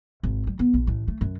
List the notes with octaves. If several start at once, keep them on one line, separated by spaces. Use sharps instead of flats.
G#1
G3
B3
A#1
A1
A3
F#2